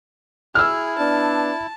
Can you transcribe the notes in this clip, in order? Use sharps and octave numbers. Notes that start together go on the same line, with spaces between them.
E4 G#4 E6 F6
B3 D4 A5